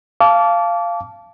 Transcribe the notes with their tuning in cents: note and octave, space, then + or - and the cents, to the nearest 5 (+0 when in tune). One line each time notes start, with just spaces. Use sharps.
F5 -10 A5 -15 D6 -30